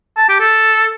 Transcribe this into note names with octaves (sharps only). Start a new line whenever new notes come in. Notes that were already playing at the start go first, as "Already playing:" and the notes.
A5
G4
A4